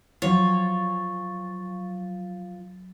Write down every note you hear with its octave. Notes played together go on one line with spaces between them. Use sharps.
F3 F#3 F4 C#5 A6